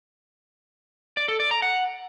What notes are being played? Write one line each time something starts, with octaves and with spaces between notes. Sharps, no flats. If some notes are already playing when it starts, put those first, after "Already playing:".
D5
A4
D5
A#5
F#5